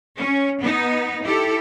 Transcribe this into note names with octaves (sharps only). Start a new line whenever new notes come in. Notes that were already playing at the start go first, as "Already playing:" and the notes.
C#4
B3 D#4
E4 G4 A4